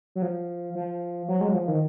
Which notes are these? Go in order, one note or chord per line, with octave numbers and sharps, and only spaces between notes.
F#3
F3
F3
F#3
G#3
F#3
F3
D#3